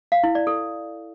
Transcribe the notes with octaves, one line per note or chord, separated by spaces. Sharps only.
F5
E4
D5
A4